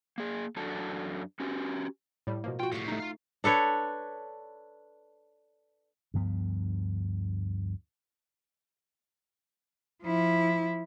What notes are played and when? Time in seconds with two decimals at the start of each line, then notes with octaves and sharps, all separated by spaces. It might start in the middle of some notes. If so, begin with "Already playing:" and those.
0.18 A#3 G#4
0.56 F#2 D4 F#4 A4 A5
1.40 C#4 F#4 G4
2.27 A2 G3
2.44 B2 F3 A#3
2.59 F4 F#4 G5
2.72 A2 G3 C#6 B6
2.88 A3 D#4
3.00 F4 F5
3.44 D4 A4 B4 C#5
6.14 D2 G2 F3 B3
10.03 F3 E4